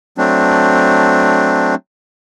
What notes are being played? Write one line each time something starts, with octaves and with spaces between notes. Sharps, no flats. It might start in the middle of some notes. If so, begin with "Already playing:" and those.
F#3 A3 C4 D4